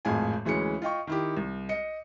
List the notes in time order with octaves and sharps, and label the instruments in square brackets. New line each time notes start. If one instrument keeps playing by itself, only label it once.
[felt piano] G#1 F2 A2 F4 G#4 G#5
D2 E3 G#3 C#4 C#7
F4 D#5 G5 C#6
D#3 E4 G4
C2
D#5 C#7